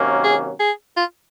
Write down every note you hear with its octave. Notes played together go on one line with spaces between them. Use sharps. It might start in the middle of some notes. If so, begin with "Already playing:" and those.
Already playing: C3 D#3 F#3 A#3 C#4
G#4
G#4
F4